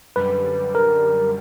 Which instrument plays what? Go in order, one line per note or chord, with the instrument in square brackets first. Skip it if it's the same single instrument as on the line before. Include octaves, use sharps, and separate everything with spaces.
[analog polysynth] F#2 D3 G3 [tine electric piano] B4
[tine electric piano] A#4